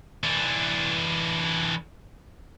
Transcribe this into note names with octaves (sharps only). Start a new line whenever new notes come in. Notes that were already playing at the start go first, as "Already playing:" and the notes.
E3 D4